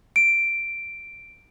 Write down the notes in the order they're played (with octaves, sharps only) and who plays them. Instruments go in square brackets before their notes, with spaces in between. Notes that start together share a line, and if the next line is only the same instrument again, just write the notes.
[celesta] D7